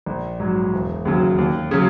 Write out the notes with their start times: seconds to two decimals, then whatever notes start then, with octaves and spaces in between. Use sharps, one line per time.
0.06 A#1
0.40 G#2 F#3
0.73 E1
1.05 D#2 C#3 F#3
1.38 D#2
1.71 C#3 F#3